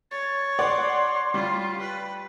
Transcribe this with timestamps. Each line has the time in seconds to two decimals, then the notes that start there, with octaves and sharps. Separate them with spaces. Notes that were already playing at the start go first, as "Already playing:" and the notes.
0.11 C#5 A6
0.59 D5 F#5 C6
1.34 G3 F4
1.80 B4